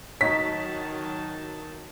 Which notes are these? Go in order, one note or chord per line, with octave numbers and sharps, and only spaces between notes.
D#3 F#3 D#4 C#5 A5 B6